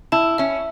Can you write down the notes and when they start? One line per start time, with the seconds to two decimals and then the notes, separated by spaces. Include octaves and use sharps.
0.12 E4 A5
0.38 C#4 E5